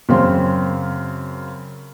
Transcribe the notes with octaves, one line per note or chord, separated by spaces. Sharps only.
F#2 C#3 C4 C5 F5 C6